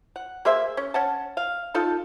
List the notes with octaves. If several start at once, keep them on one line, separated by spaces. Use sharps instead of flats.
F#5
A#3 G#4 C5 E5
C#4
C#4 F#5 A5
F5
D#4 F4 A4 A5